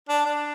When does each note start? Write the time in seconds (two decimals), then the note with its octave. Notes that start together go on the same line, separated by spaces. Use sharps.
0.09 D4
0.25 D4